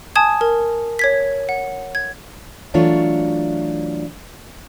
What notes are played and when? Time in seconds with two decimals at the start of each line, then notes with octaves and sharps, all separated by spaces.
0.16 G#5 A5 D#6 G#6
0.41 A#4
0.99 C#5 G#6 B6
1.49 F#5
1.95 G#6
2.74 E3 F#3 A3 D4 F4 C#5